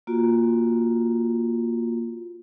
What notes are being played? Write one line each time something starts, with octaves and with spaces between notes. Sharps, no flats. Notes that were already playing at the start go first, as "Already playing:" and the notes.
A#3 F4 F#4